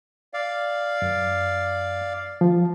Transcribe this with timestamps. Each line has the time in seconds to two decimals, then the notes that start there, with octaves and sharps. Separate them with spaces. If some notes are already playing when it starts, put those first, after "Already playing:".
0.34 D5 F5
1.02 F#2
2.41 F3